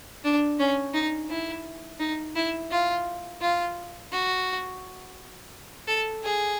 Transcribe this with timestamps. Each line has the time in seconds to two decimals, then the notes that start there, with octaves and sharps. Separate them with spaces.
0.24 D4
0.59 C#4
0.94 D#4
1.30 E4
1.99 D#4
2.36 E4
2.71 F4
3.41 F4
4.12 F#4
5.87 A4
6.23 G#4